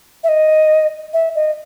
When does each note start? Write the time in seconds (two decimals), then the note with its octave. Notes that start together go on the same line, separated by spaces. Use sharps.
0.24 E5
0.29 D#5
1.13 E5
1.35 D#5